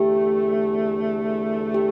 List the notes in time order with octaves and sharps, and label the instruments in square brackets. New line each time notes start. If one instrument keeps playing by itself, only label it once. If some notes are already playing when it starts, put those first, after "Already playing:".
Already playing: [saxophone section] E2 D3 A3 [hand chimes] G4
[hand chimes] G4